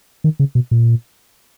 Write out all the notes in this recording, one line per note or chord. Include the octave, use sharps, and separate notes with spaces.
D#3
C#3
B2
A#2